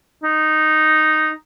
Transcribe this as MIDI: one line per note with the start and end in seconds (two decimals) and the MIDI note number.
0.24 1.31 63